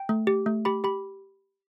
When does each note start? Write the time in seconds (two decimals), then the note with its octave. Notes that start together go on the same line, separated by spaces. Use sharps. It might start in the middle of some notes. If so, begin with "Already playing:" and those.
Already playing: G5
0.09 A3
0.27 G4
0.46 A3
0.65 G4 B5
0.84 G4 B5